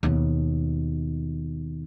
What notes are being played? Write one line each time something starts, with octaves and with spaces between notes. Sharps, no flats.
D#2 B2